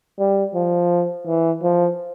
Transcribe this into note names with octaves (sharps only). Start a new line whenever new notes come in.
G3
F3
E3
F3